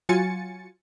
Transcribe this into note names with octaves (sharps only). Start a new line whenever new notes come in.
F#3 F4 F#4 G#5 A6 C#7